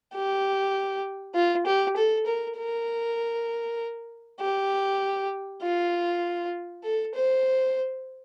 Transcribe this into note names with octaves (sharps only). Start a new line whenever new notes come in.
G4
F4
G4
A4
A#4
A#4
G4
F4
A4
C5